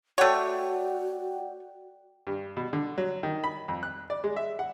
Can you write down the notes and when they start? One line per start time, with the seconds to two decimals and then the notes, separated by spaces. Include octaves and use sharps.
0.18 A3 F#4 C#5 D5 F#5 G5
2.27 G2
2.57 B2
2.73 D3
2.98 F#3
3.23 D#3
3.44 B5
3.68 F2
3.83 F#6
4.10 D5
4.24 G#3
4.36 E5
4.59 F#5